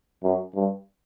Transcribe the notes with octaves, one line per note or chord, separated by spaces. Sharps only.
F#2
G2